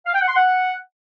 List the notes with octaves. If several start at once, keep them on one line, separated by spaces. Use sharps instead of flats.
F5
G5
F#5
C6
F#5